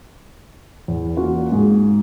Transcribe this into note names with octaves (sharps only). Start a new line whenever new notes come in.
E2
A#3 C#4 F4 F#4
G#2 G#4